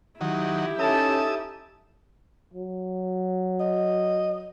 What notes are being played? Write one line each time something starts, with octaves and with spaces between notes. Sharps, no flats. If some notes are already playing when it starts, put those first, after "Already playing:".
D#3 F#3 E4 G4
C#4 D#4 A4 E5 A5 D#6
F#3
D#5